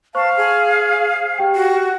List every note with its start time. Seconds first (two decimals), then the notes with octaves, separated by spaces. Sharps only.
0.15 C5 F5 A5 C#6
0.37 G#4
1.38 G4 G5
1.55 F#4